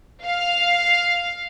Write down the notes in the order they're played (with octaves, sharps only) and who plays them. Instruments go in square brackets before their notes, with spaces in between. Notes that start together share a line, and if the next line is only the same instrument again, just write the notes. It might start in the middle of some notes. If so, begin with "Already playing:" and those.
[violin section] F5